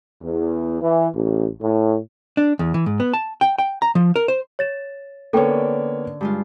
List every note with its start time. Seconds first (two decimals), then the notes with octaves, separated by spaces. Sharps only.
0.23 E2
0.82 E3
1.15 A1
1.62 A2
2.37 D4
2.59 E2
2.74 E3
2.86 G#2
3.00 B3
3.14 A5
3.41 G5
3.58 G5
3.82 A#5
3.95 F3
4.16 A#4
4.28 C5
4.59 C#5 A6 E7
5.33 D3 A#3 B3 C#4 A4 C#5 G5
6.21 G2 G#3 F4